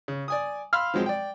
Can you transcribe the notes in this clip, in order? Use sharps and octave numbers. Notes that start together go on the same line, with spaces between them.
C#3
D5 G#5 D#6
F5 B5 C6 E6 F6
F3 F#3 G#3 C4
D5 G5